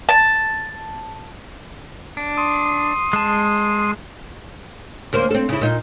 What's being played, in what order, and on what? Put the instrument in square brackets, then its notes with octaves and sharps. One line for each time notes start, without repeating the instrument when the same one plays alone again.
[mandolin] A5
[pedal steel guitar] D4
[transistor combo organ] C6 D#6
[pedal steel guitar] G#3 A5
[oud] D2 A#3 C5
C4 A4
C#3 E4
A#2 D#4